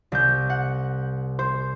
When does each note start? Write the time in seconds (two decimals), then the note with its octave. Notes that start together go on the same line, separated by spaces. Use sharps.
0.12 C2 G6
0.50 F#5
1.39 C5